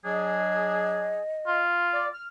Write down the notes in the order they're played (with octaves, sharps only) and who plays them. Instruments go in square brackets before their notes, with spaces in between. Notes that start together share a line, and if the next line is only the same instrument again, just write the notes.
[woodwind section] F#3 D4 G#4 [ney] D#5
[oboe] F4
[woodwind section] D5
F6